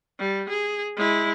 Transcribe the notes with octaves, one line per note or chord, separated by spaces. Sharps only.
G3
G#4
G#3 E4